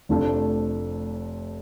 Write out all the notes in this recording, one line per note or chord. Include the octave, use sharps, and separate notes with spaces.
F1 F2 F3 A3 D4